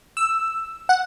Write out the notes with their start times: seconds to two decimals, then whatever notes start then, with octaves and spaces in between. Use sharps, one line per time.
0.17 E6
0.89 F#5